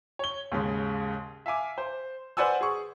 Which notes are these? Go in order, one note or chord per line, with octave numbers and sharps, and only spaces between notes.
C#5 G7
D#2 G#2 C#3
E5 F5 G#5 D6
C5
B4 C5 D5 F#5 G#5 E6
G#4 C#6